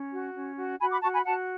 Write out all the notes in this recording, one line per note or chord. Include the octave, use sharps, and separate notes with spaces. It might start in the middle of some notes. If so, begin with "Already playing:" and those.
Already playing: C#4
F#4
C#4
F#4
F#4 G#5 B5
B5 D6
F#4 A5 C#6
G#5 B5
F#4 F#5 A5